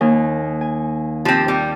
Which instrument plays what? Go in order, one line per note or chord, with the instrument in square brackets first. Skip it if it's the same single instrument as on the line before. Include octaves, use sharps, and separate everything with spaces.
[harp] D#2 D#4 G#5
G#5
[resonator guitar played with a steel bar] F3 C4 [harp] G4
[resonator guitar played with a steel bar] G3